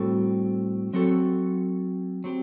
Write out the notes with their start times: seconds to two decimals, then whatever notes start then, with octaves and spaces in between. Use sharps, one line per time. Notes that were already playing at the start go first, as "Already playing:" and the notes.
Already playing: A2 G3 C4 F#4 A4
0.93 F#3 C4 F#4 A4
2.24 F#3 C4 G4